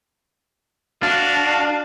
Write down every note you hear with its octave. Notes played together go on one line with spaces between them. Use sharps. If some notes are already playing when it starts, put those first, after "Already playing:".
D4 F#4 F5